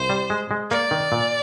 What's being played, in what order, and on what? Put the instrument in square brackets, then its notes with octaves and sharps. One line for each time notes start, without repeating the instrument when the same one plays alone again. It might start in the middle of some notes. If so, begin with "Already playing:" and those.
Already playing: [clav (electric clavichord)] C2 [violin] C5
[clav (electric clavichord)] G3
G#3
G#3
[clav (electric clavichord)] A#3 [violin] D5
[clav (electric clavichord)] D#3
A#2